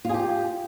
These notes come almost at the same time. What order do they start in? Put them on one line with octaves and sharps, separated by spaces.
F4 G#4 G4